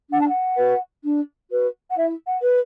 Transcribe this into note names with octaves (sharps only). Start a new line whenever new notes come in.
D4 F#5
A5
F#5
F#4 B4
D4
F#4 B4
F#5
E4 E5
F#5
B4